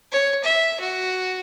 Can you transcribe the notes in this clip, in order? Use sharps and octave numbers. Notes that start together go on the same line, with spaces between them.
C#5
E5
F#4